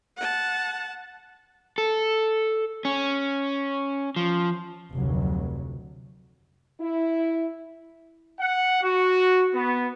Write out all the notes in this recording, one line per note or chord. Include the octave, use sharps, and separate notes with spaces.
F#5 A5
A4
C#4
F3
F1 D2 F#3
E4
F#5
F#4
B3